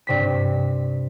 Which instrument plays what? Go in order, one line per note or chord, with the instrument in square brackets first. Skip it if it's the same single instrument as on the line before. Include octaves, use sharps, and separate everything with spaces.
[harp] G2 C3 B6